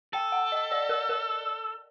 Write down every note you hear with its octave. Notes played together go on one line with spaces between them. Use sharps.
A4 G5
F#5
D#5
D5
A#4
A#4